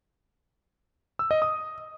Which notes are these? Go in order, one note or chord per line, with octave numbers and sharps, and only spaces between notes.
E6
D#5
D#6